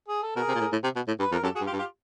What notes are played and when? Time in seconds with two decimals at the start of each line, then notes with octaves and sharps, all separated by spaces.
0.08 G#4
0.23 A4
0.36 B2 G#4 A#4
0.48 C3
0.55 A#2
0.60 A2
0.72 A2
0.83 C3
0.96 B2
1.07 A2
1.19 G2 B4
1.32 F2 A#4
1.43 F#2 G4 A4
1.55 F#4 G#4
1.61 G2
1.66 F4 G4
1.73 G2
1.78 F4 G4